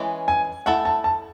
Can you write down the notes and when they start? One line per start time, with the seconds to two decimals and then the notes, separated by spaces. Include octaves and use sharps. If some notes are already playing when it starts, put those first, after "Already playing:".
Already playing: E3 G#3 C#4
0.28 G#5
0.66 A3 E4 A4 F#5
0.85 A5
1.04 A5